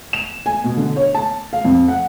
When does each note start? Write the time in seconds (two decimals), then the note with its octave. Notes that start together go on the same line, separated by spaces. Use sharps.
0.13 E7
0.46 G#5
0.64 B2
0.77 D3
0.96 C#5
1.14 A5
1.53 F5
1.65 F2
1.88 F#5